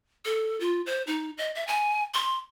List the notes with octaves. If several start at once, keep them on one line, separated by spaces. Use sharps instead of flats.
A4
F4
C5
D#4
D#5
E5
G#5
C6